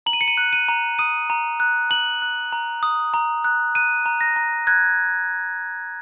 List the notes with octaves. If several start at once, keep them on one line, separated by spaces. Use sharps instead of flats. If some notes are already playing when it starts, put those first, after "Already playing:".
A#5 F#7
D#7
C#7
D#7
F#6
D#7
A#5
D#6 D#7
A#5
F#6
A#5 F#7
F#6
A#5
D#6
A#5
F#6
F#6 D#7
A#5
A#6
A#5
F#6 G#6